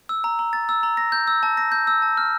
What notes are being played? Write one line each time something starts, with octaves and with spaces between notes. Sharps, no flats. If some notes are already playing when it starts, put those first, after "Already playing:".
E6
A#5
A#5
A6
E6
A#5
A#6
G6
E6
A5
A#6
G6
E6
A5
F6